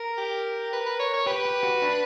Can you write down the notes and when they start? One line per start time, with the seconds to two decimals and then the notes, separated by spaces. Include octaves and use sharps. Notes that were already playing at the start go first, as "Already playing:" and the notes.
Already playing: A#4
0.18 G4
0.73 B4
0.86 B4
1.00 C#5
1.14 C#5
1.26 G4 B4
1.45 G4
1.63 F#4
1.82 D4